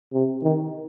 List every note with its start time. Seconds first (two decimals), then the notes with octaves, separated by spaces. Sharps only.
0.13 C3
0.43 D#3